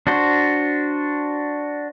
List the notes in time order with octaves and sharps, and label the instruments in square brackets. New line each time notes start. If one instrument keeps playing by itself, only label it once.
[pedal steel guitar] D4 F#4 C5